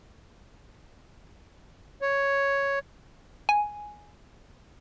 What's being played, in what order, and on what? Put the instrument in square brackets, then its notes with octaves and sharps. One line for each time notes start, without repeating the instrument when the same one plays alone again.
[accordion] C#5
[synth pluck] G#5